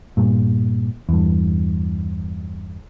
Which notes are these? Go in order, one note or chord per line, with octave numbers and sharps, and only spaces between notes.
G2 A#2
E2 G2